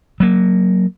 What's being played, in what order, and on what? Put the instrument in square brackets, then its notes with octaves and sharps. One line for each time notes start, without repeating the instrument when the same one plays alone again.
[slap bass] F#3 A#3